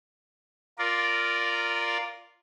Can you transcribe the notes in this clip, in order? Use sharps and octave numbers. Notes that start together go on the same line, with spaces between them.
F4 A#4 D5